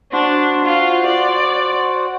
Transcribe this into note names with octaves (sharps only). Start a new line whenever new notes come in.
D4 F#4 C5
F4
D5